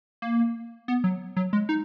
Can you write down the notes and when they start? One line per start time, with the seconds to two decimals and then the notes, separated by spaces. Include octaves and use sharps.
0.22 A#3
0.88 B3
1.04 F#3
1.37 F#3
1.53 G#3
1.69 D#4